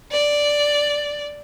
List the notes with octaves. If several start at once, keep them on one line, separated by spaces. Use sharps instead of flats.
D5